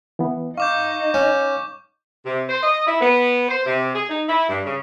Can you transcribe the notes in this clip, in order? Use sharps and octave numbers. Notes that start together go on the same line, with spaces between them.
E3 B3
D#4 F5 C#6 D6 G6
C#4
C3
C5
D#5
E4
B3
C5
C3
G#4
D#4
E4
G2
C#3